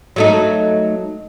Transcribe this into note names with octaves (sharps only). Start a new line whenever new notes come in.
F#3 A3 D#4